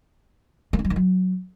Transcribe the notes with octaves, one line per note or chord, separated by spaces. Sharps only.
A#3
D#4
G3
D#3
F#3